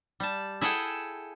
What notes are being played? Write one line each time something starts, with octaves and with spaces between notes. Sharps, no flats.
G3 A5
E4 G#4 A4 F#5 G5